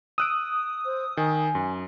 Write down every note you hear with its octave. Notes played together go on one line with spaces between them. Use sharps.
D#6 E6 F#6 D7
C5
D#3 G#5
F#2